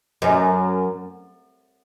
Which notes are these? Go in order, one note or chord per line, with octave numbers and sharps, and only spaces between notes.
F#2